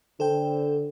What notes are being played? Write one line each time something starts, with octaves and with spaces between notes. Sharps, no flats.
D3 A4 C5 G5